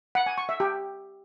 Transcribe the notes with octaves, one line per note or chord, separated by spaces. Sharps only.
F#5
G#5
C#6
E5
G4